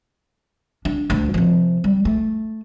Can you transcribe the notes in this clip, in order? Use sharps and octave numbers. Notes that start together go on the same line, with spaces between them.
D4
D2 D3
C3 F3
G3
A3